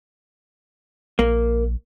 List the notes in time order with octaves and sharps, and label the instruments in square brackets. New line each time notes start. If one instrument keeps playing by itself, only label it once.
[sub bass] A#1 [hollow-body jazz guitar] A#3